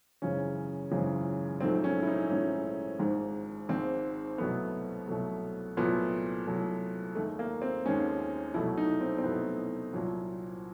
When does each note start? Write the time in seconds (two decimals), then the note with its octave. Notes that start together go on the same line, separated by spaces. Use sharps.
0.22 G#1 F#2 C#3 E3 G#3 C#4
0.91 G#1 F#2 C#3 E3 G#3
1.61 A#1 G#2 D#3 F#3 A3 C4
1.84 C#4
2.03 E4
2.07 D#4
2.30 A#1 G#2 D#3 F#3 A3 C#4
2.99 G#1 G#2 D#3
3.69 G#1 G#2 D#3 C4
4.38 C2 B2 F#3 A3 B3
5.08 C2 B2 F#3 A3
5.77 C2 A#2 F#3 A3 B3
6.47 C2 A#2 F#3 A3
7.15 D#2 D#3 G#3 A3
7.39 A#3
7.62 C4
7.85 D#2 D#3 G#3 C#4
8.54 C2 B2 F#3 A3 E4
8.77 D#4
9.01 C4
9.18 C4
9.24 C2 B2 F#3 A3 B3
9.93 C2 A#2 F#3